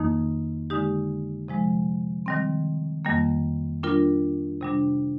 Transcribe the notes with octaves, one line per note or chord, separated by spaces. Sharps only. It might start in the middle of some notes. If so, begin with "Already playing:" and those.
Already playing: F2 D#3 A#3 D#4
D3 G#3 D#4 G4
C3 F3 G#3
D#3 G3 C4
F2 D#3 G3 A#3
G3 D4 F4 A#4
C3 G3 D4